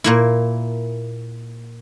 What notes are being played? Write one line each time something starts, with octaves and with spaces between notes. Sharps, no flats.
A#2 A#3 E4